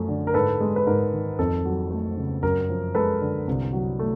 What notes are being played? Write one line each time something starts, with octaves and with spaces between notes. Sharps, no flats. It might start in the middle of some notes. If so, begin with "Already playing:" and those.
Already playing: F#2 F3 A3
D3
A#4
G#2 A4 B4
G#3
B4
G#2 A#4
D#3
F2 A4
F#3
A3
C#3
F#2 A#4
F3
G#3 A4 B4
D3
C2
F#3
A3